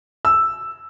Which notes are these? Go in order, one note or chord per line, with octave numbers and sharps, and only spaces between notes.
E6